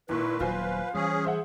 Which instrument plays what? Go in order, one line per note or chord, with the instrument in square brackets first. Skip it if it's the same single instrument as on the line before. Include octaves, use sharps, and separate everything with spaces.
[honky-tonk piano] G#1 A#2 C#6 [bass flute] E4 [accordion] B4
[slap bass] D#1 F#3 [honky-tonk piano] F4 C5 G#5 [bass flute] F5
[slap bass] E3 G3 [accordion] C#4 G#4
[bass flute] G#4 [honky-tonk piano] C5 E5 F#5